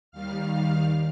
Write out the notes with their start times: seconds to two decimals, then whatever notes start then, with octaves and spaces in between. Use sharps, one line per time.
0.11 D#2 D#3 G3 F5 F6
0.47 F5 F6